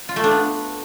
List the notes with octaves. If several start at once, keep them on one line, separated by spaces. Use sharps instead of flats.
F4
A3
D4
B3